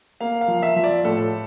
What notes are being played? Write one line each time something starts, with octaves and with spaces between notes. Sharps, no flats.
A#3 F5
F5
F3
E5
F3
D5
A2 A4